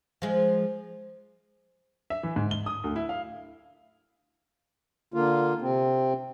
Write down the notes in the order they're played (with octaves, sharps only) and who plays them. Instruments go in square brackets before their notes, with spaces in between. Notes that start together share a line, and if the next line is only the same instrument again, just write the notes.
[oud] F3 G#3
[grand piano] E5
E3
G#2
G7
D#6
D2
E4
F5
[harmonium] D3 A#3 F4
C3 C4